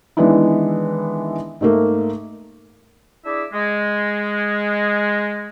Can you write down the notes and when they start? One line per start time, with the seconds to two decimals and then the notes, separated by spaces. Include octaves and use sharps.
0.17 D#3 E3 G#3 B3 D4 E4
1.61 G#2 A3 A#3
3.25 D4 E4 G#4 D5 E5
3.53 G#3